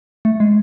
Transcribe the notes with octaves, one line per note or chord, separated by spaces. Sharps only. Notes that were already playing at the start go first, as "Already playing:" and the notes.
A3
G#3